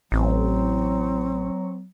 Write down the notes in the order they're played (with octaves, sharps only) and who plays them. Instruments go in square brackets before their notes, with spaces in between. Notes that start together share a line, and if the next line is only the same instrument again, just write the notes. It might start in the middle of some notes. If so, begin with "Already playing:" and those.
[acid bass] A1 [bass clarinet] F#3 [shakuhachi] C4